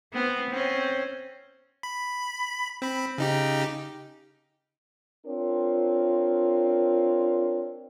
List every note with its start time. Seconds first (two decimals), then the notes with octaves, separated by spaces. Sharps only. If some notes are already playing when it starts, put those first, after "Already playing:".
0.14 B3 C4
0.50 C4 C#4
1.83 B5
2.82 C4 B5
3.18 C#3 D#4 G4
5.26 C4 D4 F4 A#4 C#5